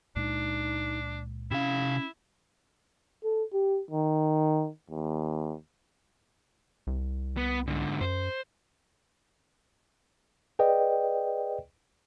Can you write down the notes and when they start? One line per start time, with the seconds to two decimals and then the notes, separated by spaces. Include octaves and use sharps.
0.16 C#2 A#2 G#3 D4 D#4
1.51 C3 C#4 E4 F5
3.23 A4
3.53 G4
3.91 D#3
4.90 D#2
6.87 C2
7.37 B3
7.67 G#2 D3
8.01 F#2 C5
10.59 G#4 B4 D5 D#5 G5